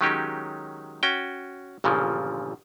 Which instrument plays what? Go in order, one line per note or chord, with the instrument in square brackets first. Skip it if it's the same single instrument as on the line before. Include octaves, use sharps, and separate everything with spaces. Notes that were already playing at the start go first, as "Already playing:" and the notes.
[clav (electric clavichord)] D#3 F#3 G#3 C#4 D#4 G4
C#4 F#4 G5
G1 A#2 C#3 E3 F3